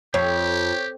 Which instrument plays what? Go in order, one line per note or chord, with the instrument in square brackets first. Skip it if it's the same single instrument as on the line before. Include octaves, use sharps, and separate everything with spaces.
[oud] F2 [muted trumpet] G4 [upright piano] C#5